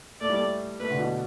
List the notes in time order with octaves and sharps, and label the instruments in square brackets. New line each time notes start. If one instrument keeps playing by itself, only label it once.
[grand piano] A3 [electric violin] D5
[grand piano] G3
A3
[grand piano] A3 [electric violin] B4
[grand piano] D3
B2